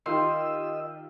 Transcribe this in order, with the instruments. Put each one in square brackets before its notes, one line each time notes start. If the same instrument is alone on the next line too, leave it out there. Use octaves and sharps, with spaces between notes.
[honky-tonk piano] D#3 F4 G4 [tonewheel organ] D#5 E6 [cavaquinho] C6